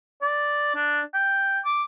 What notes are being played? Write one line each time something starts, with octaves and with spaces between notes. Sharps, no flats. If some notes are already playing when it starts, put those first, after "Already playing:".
D5
D4
G5
D6